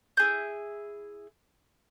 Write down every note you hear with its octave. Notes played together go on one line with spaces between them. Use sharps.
E4 G#4 G6